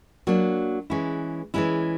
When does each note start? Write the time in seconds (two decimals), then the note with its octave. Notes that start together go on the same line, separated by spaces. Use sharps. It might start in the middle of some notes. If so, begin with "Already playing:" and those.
0.27 F#3 A#3 D4
0.90 E3 G#3 C#4 E4
1.54 E3 G#3 C#4 E4